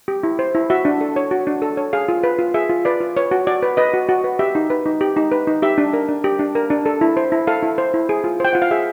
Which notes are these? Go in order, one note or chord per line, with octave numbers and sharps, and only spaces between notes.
G4
E4
C5
E4
F#4 E5
D4
A4
C#5
F#4
D4
A4
C#5
G#4 F5
F4
B4
F4
G#4 E5
F4
B4 D5
F4
B4 C#5
F#4
F#4 D5
B4
B4 D#5
F#4
F#4
B4
G4 E5
D#4
B4
D#4
G4
D#4
B4
D#4
G4 E5
D4
A#4
D4
G4
D4
A#4
D4
A4
E4
C5
E4
A4 F5
E4
C5
E4
G#4
F4
C5 G5
F4 F#5
F5
G#4 E5